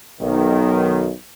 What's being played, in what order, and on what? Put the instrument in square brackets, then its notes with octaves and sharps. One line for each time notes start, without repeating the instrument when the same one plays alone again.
[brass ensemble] B1 D#3